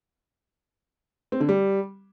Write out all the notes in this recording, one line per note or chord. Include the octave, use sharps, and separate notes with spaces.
C4
D3
G3